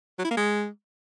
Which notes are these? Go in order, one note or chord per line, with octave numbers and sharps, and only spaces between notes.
F#3
E4
A#3
G#3